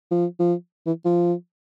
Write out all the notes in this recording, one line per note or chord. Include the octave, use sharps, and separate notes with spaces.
F3
F3
E3
F3